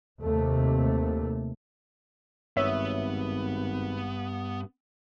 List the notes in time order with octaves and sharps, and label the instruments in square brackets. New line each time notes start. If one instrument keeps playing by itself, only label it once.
[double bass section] D#2 C3 A3
[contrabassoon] G#1 [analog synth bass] G2 [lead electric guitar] B3 [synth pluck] C#5 E5